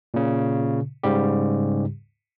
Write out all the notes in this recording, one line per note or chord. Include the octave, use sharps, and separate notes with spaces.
A#2 C#3
G#2 C#3 G3 G4